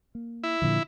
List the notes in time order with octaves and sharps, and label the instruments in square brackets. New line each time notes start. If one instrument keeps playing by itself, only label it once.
[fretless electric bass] A#3
[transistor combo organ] E4
[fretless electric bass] A#2 D3 F3